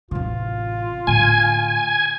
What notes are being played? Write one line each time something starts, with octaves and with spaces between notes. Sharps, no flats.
A1 C3 F4
A2 D3 G#5